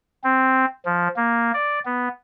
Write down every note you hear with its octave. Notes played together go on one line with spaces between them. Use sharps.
C4
F3
A#3
D5
B3